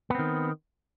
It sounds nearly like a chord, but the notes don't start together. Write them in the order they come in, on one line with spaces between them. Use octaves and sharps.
B3 C4 D#3